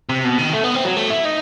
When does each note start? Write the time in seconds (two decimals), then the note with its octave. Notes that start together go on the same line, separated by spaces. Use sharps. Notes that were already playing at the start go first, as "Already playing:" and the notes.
0.09 C3
0.24 B2
0.38 D#3
0.53 A3
0.64 B3
0.75 C4
0.85 F#3
0.96 A3
1.10 E4
1.25 D#4